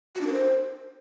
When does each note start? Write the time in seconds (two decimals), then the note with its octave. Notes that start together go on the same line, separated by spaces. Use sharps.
0.15 F#4
0.21 D4
0.27 A#4
0.32 C5